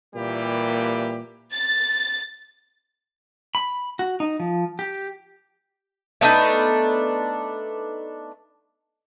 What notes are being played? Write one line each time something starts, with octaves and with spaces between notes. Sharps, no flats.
A#2 E3 G3 A#3 G4
A6
B5
F#4
D#4
F3
G4
A3 B3 D4 D#4